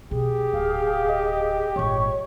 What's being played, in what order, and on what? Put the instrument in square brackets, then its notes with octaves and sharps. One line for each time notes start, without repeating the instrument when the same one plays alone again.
[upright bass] B2 [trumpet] G4 [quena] G#4
[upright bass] D1 [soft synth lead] F5
[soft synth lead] D#5
[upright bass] G#1 A#2 [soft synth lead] C#5 [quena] C#6